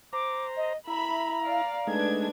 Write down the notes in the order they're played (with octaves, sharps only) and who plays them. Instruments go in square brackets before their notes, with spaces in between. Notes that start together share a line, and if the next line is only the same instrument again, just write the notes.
[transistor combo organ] C5 A#5 [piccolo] D6
[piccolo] D#5
[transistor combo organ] E4 [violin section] E5 B5 [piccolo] A#5
[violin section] D5 F5
[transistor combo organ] G#3 A3 D#4 [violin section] D4 B4 G#6